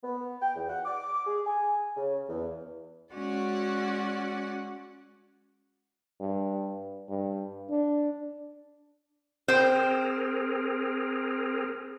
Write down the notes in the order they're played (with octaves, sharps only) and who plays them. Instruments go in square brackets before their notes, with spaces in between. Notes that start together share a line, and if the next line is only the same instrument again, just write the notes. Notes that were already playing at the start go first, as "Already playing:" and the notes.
[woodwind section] B3
G5
E2
F#5
D6
G#4
G#5
C#3
E2
[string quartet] G#3 C#4 F#4 D5 F#5
[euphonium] G2
G2
D4
[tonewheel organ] C4 G#4 A#4 [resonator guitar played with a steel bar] C5 G5